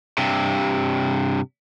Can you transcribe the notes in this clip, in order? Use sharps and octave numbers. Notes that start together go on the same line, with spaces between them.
G2 C3